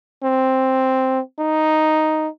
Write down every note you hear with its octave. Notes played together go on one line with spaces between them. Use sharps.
C4
D#4